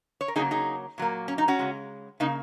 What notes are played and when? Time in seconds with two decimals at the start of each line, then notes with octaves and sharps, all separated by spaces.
0.21 C#5
0.28 A#4
0.36 C#3 F#3 A#3 D#4 G#4
0.51 D#4 G#4
0.98 A#2 F#3 A#3
1.28 C#4
1.38 D#4
1.48 C#4 F#4
1.59 C#3 G#3
2.20 C#3 A#3 D#4